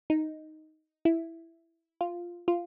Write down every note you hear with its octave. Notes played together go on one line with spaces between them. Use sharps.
D#4
E4
F4
F4